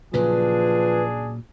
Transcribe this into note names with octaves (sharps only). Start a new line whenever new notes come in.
A#2 C#3 F3 F#3 D4 G#4 B4